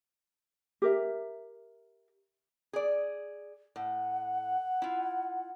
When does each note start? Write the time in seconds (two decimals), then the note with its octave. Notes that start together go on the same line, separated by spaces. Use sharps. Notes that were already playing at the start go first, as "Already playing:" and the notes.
0.82 G4 A#4 E5
2.73 G#4 D5
3.76 A2 F#5
4.82 E4 F4